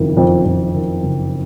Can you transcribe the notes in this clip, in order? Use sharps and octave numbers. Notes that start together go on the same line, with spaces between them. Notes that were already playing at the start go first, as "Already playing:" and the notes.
Already playing: F#1 F2 D#3
F2
F2
D#3
F#1